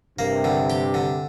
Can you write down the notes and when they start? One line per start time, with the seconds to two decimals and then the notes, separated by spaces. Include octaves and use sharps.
0.18 G2 C3 A#3
0.44 D3
0.70 G4
0.94 D3